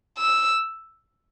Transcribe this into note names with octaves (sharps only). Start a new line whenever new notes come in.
E6